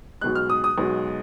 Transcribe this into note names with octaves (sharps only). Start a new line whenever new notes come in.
B1 B2 G#3 F#6
F6
D#6
D#6
B1 B2 G#3